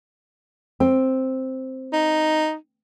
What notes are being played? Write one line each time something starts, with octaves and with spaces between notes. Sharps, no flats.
C4
D#4